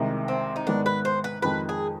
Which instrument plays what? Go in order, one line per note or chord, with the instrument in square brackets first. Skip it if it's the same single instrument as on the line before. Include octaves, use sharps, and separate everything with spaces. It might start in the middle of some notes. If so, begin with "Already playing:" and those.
Already playing: [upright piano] C2 C3 D#3 G#3
[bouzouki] C4
D#4
[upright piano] G#2 D#3 G#3 B3 [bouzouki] D4
[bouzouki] B4
C5
B4
[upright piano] F2 D#3 G#3 [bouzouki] B4
[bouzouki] G#4